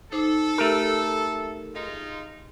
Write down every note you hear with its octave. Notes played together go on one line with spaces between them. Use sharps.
D#4 A4 C5 D6
A3 G4 A#4
G#3 D#4 F4